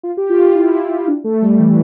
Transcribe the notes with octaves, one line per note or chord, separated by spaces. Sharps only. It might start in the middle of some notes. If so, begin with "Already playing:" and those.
F4
G4
F4
E4
D4
A3
G3
E3